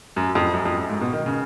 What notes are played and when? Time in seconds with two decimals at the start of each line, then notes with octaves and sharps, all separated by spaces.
0.16 F#2
0.35 F2
0.54 F#2
0.65 F2
0.77 F#2
0.89 G#2
1.01 B2
1.13 D#3
1.26 C#3